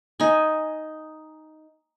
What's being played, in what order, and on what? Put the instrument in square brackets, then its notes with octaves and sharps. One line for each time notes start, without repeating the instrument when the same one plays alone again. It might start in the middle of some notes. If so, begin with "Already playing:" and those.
[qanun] D#4 G#5